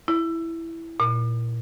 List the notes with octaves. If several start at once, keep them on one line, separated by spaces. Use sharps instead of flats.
E4
A#2